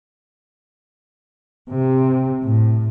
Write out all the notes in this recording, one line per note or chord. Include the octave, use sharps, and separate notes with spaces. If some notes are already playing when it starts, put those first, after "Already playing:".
C3
A2